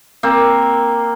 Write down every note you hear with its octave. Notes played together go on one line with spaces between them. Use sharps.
A#3 C4